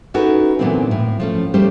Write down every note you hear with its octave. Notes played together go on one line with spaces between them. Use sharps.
C#4 D#4 E4 F#4 A4 B4
A#2 D3 E3 F#3 B3 C4
A2
F3 A3 C#4
G3 A3 C#4 G4 C5